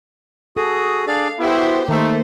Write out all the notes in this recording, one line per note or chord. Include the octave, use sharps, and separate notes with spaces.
F#4 G#4 A4 D#6
D4 G#4 D5 F5
B3 E4 F#4 G4 C5
D#3 A3 A#3 D#4 C5